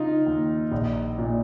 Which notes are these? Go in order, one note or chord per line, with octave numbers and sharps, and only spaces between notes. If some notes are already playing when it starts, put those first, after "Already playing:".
Already playing: C#3 D#4 F4
D#2
A#1
A#2